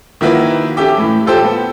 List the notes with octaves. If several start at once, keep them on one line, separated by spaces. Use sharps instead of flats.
D#3 F3 A#3 E4 F#4 B4
C#4 G4 A4 E5 G5 D6
A2 E3
F4 G4 A4 C5 G5
B3